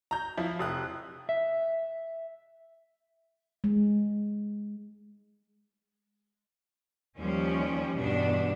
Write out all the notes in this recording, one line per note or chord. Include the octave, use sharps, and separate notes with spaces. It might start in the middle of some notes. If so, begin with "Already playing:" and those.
A#5 G6
F3 E4
F1 D#6 F#6
E5
G#3
D#2 F3 G3 C#4
E2 G2 B2 G3 D4